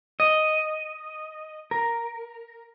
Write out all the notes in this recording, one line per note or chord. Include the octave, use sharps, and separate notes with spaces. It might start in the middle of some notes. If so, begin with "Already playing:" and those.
D#5
A#4